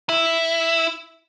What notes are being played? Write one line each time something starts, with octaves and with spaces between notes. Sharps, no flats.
E4